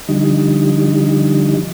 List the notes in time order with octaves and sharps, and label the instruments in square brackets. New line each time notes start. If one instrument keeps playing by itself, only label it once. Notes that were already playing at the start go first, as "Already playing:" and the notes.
[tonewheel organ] D3 F3 G3 D#4